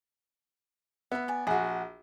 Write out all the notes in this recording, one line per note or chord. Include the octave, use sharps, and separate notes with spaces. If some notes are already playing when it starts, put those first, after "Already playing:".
B3 E5 B5
D5 G#5
A#1 F#4 G#4 F#5